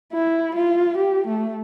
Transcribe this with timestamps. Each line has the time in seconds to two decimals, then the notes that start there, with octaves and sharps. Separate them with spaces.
0.13 E4
0.55 F4
0.98 G4
1.27 A3